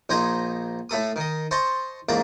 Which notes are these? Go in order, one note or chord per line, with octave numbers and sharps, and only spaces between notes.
A#1 D#4 C5 D#5 G#5 A#5
A2 A3 A4 D#6
D#3 D#5
C5 D#5 A5 C6 C#6
A1 G#2 A#3 A5 A#5